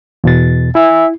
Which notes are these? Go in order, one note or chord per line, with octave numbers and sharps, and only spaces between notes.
E2 B2 A6
E4 E5 G#5